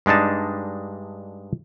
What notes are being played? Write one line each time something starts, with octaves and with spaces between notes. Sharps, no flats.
G2 G#3 D4 D#4 A5